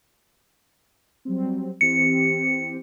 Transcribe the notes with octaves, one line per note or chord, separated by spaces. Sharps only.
F#3 G3 C4
E3 C4 G4 C#7